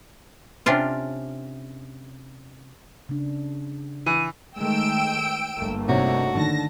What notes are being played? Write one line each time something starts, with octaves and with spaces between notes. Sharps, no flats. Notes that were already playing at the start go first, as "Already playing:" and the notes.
C3 C#4 D4 F4
C#3 D4
E3 D#7
D#3 G#3 A3 G5 E6 D7
G1 A3 A#3
C3 D4 D#4 F#4 C#5
D3 D#3 A5 A#6